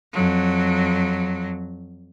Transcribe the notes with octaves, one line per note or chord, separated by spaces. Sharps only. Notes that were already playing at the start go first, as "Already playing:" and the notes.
F2 F#3